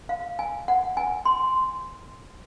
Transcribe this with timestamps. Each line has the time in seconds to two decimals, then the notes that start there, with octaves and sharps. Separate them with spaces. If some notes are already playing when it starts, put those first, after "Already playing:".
0.09 F5
0.39 G#5
0.68 F#5
0.97 G#5
1.25 C6